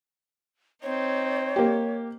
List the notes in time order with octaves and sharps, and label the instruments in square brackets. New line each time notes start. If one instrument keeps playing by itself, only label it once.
[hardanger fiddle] C4 D#4 [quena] C#5
[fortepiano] A#3 G4